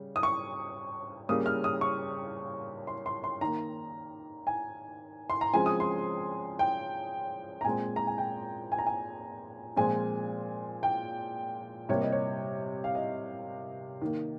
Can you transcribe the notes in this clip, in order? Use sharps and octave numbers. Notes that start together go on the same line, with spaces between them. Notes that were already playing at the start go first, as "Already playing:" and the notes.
Already playing: C#3 G3
D#6
C#6
C#3 G3 A#3 D#6
F6
D#6
C#6
C6
C6
C6
D#3 A#3 A#5
G#5
C6
A#5
C#3 F3 G#3 C4 G#5
D#6
C6
G5
A#5
A#2 G#3 C4 G#5
A#5
G#5
G5
G#5
A#5
G#5
A#2 F3 G#3 C4 G#5
G5
C3 G3 A#3 C#5
D#5
C#5
F5
D#5
D#3 A#3